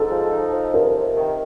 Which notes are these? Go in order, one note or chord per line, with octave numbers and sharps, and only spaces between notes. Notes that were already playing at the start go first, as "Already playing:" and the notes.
Already playing: G#2 A4
F3
D#4
F3
C3 A#4
C3
D#3